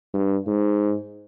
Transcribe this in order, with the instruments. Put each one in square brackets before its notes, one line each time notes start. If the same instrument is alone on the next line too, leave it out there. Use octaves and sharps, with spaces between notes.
[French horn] G2
G#2